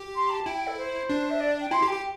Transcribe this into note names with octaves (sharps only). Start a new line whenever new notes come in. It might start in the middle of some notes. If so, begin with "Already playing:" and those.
Already playing: G4
C6
A5
E4 G5
G5
A4
C5
D4
E5
D5
G5
E4 C6
G4
G5
G4